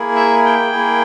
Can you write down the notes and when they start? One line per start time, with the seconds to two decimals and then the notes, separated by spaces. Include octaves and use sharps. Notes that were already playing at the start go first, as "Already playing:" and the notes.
Already playing: A#3 E4 G#4
0.16 E5
0.45 G5
0.72 A#3 E4 G#4